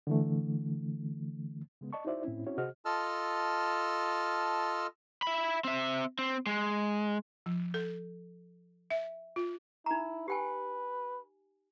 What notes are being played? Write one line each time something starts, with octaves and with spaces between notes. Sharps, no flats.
D3 E3 A3
C#3 G#3 B3
D5 D#5 A5 C#6
D#4 E4 F#4 C5 D5 E5
A2 C4 C#4 E4
C4 C#4 E4 F#4 C#5
C3 F#4 G#4 C5 D#5 F6
F4 A4 D#5 A5 E6 F6
E5 B5
C4 E5
C4
G#3
F3
A4
E5
F4
D#4 E4 A#5
G4 B4 G5 G#5